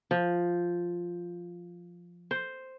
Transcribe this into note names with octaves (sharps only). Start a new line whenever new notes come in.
F3
C5